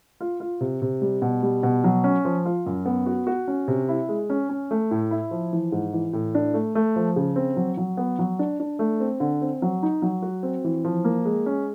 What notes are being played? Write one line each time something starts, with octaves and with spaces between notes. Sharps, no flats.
F4
F4
C3
C3
G3
B2
G3
B2
F#3
C#4
F3
F4
F#2
B3
F#4
F#4
C#4
C3
E4
G#3
C#4
C#4
A3
A2
E4
F3
E3
G#2
E3
A2
D4
A3
A3
F3
C#3
C4
F#3
F#3
B3
F#3
D4
D4
A3
C4
D3
C4
F#3
D#4
F#3
F#4
C4
E3
F3
A#3
G#3
C#4